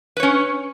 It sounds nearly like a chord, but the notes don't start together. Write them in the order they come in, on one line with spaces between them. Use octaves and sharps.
B4 C#5 C#4